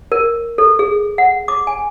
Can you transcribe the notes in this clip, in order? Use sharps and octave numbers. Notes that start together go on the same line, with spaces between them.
A#4
A4
G#4
F#5
D6
G#5